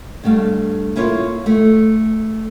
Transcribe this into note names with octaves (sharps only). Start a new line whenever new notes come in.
G2 A3 F5
A#3 E4 F4 C#5
A3